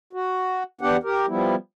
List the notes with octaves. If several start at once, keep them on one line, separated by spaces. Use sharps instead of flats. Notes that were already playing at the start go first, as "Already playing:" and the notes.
F#4
E2 B3 D4 G4 F#5
G4 A#4
F3 G3 B3 E4